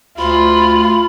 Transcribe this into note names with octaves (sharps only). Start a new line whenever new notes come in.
D2 F4 B5